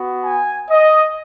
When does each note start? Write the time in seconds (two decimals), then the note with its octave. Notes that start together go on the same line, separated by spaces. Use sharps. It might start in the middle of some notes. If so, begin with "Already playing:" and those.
Already playing: B3 F#4
0.23 G#5
0.70 D#5